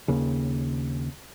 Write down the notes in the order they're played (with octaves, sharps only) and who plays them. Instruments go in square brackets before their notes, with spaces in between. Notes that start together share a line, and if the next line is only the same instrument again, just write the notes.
[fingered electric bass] D#2 C#3